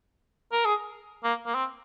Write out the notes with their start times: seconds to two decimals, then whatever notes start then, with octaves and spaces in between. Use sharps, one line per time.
0.53 A#4
0.65 G#4
1.24 A#3
1.46 A#3
1.55 C4